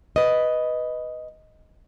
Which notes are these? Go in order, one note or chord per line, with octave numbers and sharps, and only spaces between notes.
B4 D#5